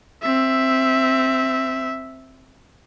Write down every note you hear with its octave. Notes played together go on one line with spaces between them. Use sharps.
C4 E5